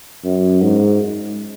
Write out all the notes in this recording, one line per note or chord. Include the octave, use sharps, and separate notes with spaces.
F#2
G#2